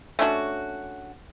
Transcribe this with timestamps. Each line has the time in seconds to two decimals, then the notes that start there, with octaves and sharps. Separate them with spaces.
0.19 A3 C#4 D4 F#4